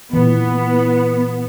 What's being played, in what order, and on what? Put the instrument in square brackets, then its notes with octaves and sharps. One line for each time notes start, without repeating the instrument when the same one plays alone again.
[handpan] A#2 E3 [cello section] B3